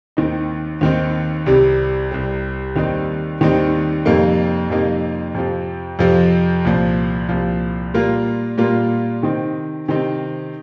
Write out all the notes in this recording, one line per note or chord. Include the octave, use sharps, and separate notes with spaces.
D#2 D#3 C4 D#4
D#2 D#3 C4 D#4
C2 C3 G3
C2 C3 G3
D#2 D#3 G3 C4 D#4
D#2 D#3 G3 C4 D#4
F2 C3 G3 A#3 D#4
F2 C3 G3 A#3 D#4
F2 C3 F3
F2 C3 F3
C2 A#2 F3
C2 A#2 F3
A#2 G3 A#3 F4
A#2 G3 A#3 F4
C3 D#3 C4 D#4
C3 D#3 C4 D#4